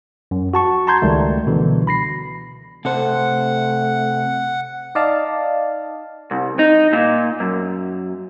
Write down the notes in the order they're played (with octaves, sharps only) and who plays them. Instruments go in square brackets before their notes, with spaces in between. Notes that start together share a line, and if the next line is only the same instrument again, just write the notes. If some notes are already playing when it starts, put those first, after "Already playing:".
[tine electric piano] F#2
F#4 A5 C#6
A5 A#5 C6 G6 G#6
C#2 D#3 G3 A3
B2 D3 E3
B5 A#6 C7
[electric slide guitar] C3 A4 C5 [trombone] A3 [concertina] F#5
[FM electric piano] D#4 D5 D#5 F5 A5
[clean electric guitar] C2
D#4
A#2
F#2